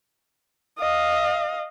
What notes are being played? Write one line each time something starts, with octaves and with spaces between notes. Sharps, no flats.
D#5 F5